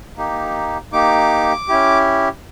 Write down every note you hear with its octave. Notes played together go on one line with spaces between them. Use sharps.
A#3 D#4 G4
A#3 D#4 G4 D6
C#4 E4 G4